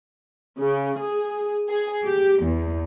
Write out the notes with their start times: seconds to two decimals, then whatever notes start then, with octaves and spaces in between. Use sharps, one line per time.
0.59 C#3
0.99 G#4
1.69 G#4
2.04 G4
2.44 E2